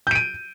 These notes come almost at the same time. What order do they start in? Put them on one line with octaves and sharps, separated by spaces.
G6 D7 D#7